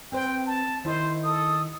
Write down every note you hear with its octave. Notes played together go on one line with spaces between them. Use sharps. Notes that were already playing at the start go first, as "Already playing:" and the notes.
C4 B4 C5 G5
A5
D#3 E4 C5 D#5
A4 D#6